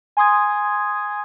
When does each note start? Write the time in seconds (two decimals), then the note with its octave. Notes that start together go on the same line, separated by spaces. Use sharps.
0.17 G#5 C6 D#6 G#6